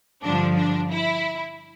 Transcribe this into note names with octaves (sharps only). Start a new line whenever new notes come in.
G2 D3 F3 D4
D4
E4